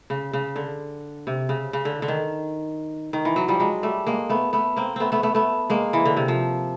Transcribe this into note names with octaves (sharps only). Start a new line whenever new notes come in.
C#3
C#3
D3
C3
C#3
C#3
D3
D3
D#3
D#3
E3
F#3
F3 G3
F#3 G#3
G3 A3
G#3 A#3
A3 B3
A3 B3
A#3 C4
A3 B3 C4
A3 B3
A3 B3
A3 B3
G#3 A#3
E3
D3
C3
F3